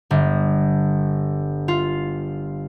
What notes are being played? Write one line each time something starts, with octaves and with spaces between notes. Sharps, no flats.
G1
F4